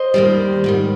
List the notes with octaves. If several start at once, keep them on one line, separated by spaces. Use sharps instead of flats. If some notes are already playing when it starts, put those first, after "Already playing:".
Already playing: C5 D#5
D#2 D#3 G3
G#2 D#3 G3